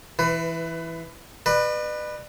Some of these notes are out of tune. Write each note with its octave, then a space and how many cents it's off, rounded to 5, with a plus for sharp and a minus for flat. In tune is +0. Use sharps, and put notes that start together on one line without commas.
E3 +0 B4 +25
B4 +0 D5 +45